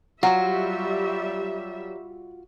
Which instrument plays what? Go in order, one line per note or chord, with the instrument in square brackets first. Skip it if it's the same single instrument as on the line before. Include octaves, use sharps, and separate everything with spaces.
[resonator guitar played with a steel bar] F#3 [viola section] G3 E5 [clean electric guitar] F4 F#4 [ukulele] F#5